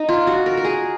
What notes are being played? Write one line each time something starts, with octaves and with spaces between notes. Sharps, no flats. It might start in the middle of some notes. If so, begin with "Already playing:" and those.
Already playing: D#4
F4
F#4
A#4
A#4
G#4